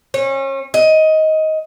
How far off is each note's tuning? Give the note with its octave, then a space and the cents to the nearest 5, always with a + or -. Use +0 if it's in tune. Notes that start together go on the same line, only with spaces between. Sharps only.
C#4 -35
D#5 +15